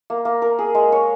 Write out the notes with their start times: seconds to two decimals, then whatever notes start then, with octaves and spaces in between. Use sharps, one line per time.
0.10 A#3
0.25 A#3
0.42 A#4
0.59 G#4
0.75 G#3
0.92 C#5